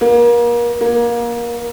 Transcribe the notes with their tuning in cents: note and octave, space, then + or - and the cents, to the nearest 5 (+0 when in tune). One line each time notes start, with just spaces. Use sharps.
A#3 +35
A#3 +25